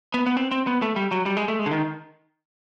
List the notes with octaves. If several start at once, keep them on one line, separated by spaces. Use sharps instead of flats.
B3
B3
C4
C4
B3
A3
G3
F#3
G3
G#3
A3
G#3
D3
D#3